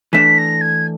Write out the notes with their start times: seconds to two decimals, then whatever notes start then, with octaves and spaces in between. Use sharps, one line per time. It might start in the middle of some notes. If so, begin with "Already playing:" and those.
0.13 E3 A3 D4 B6
0.38 A#6
0.61 G#6